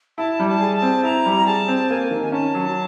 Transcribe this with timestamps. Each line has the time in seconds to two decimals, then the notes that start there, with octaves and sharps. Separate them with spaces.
0.18 E4 A5
0.40 G3
0.47 A5
0.61 G#4
0.76 A5
0.82 C4
1.03 E4 A#5
1.26 G3
1.47 G#4 A5
1.68 C4
1.90 A#3 G#5
2.11 D#3
2.22 G#5
2.32 C#4 A5
2.54 F#3